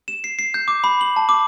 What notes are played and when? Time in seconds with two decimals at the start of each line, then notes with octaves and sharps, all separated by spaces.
0.08 E7
0.24 C7
0.39 C7
0.54 G6
0.68 D6
0.84 B5
1.01 F#7
1.16 A5
1.29 D6